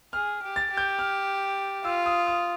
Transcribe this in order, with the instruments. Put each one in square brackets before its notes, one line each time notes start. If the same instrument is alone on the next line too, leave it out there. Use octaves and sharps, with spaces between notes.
[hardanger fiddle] G#4 [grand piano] F6
[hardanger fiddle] G4
[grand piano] A6
[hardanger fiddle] G4
[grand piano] G6
F6
[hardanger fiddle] F4 [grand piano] E6
[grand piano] D#6
D#6